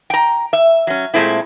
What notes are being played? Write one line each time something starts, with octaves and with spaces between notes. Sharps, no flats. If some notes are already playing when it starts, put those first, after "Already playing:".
G5 A#5
E5
F#3 C#4
A#2 G#3 A3 C4 E4